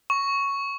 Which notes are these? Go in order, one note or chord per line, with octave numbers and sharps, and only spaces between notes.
C#6